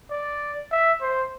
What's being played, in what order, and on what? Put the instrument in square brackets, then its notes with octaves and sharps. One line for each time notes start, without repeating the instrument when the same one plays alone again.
[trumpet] D5
E5
C5